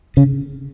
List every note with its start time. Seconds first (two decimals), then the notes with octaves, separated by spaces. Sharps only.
0.17 C#3